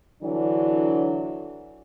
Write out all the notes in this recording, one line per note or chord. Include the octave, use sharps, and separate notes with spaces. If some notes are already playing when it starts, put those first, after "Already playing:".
D3 E3 F#3 D4